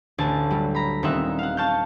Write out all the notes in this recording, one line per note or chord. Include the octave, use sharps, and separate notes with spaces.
A1 D2 G#5 A5 A6
F#3 G3
A#5 B5
D#1 G3 C4 D#4 E5 F#5
F5 F#5
F5 A5 C#6 F6 G6